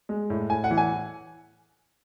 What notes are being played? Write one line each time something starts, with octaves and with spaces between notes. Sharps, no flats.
G#3
A2
A2 G#5
F#5
E3
G#5